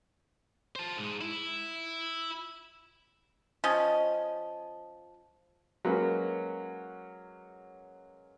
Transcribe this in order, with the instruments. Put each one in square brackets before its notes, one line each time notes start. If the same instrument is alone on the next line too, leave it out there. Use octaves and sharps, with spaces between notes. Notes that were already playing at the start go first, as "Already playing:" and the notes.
[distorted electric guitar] C5 A5
G#2 G#3
E4
[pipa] F3 C#4 D#5
[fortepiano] F#3 G#3 A#3 C#4 B4